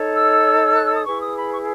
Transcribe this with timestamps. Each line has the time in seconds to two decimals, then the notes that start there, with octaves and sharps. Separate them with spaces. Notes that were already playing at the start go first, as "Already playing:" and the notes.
Already playing: D#4 A4 C#5
0.15 E6
0.75 F#6
0.85 E6
0.95 D#6
1.06 E4 G#4 B4 C#6
1.21 D#6
1.36 B5
1.52 C#6